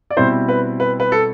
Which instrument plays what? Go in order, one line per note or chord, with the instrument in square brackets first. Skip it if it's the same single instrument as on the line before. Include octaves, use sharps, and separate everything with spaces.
[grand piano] D5
B2 G3 C4 E4 C5
B4
B4
B4
A4